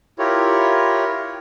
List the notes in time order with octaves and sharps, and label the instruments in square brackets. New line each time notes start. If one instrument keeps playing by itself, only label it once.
[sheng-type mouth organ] E4 F4 G4 A#4 C#5